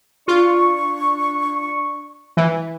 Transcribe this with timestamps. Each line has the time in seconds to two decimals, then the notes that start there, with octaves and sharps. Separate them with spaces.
0.28 D4 F4 C#6
2.37 E3